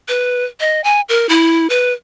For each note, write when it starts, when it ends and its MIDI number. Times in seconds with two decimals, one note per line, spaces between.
0.08 0.44 71
0.60 0.81 75
0.84 1.01 80
1.09 1.29 70
1.29 1.67 64
1.70 1.93 71